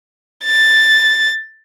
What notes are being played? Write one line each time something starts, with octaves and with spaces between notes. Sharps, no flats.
A6